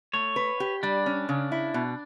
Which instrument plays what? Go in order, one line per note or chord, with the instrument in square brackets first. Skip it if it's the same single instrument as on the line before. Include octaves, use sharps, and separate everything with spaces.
[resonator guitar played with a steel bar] A3 [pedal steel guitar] C#5
[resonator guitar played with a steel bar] B4
G4
[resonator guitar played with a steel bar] G3 [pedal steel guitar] D4
[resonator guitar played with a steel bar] C#4
C#3
E4
B2